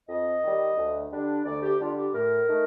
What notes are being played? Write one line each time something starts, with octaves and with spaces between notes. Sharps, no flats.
F2 D#5
D#3 G3
D2
D3 G3 D4
D2 D5
G4
D3 G3 D4 F4
G4
A2 A#4
A3 D#4